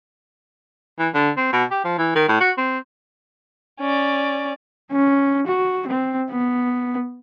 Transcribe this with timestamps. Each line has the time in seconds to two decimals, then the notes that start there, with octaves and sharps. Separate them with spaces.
0.99 E3
1.15 D3
1.37 C4
1.53 B2
1.71 G4
1.85 F3
1.99 E3
2.15 D#3
2.29 A2
2.41 F#4
2.58 C4
3.81 C#4 D5
4.92 C#4
5.47 F#4
5.87 C4
6.31 B3